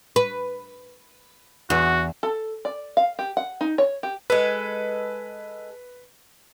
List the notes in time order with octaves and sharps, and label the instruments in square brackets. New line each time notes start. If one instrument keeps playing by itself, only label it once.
[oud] B4
[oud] E2 [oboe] F#4
[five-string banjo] A4
D5
F5
G4
F#5
D#4
C#5
G4
[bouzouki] G#3 A4 [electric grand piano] B4